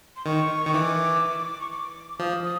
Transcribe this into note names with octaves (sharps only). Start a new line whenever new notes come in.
C6
D#3 C#6
D#3
E3 D6
C#6
D6
F3 D#6
D#6